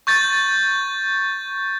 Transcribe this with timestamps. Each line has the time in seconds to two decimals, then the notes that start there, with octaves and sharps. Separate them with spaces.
0.07 C#6 G6 A6